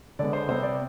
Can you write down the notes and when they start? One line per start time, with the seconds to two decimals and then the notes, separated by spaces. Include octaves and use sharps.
0.19 D3 G#3 B3 D5
0.33 C5
0.48 C3 G3 B3 C5
0.63 D5